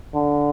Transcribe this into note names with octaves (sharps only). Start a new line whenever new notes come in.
D3